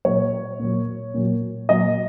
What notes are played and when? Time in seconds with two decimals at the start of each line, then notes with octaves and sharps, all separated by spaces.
0.05 A#2 F#3 C#5
0.59 A#2 F#3
1.14 A#2 F#3
1.69 A#2 F#3 D#5